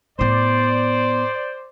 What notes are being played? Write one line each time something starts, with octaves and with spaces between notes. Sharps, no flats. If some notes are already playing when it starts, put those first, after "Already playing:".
A2 B3 C5 D5